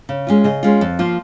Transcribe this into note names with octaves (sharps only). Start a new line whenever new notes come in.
C#3
G#3 C#4 F4
C#3 D#5
G#3 C#4 F4
F2
F3 A#3 F4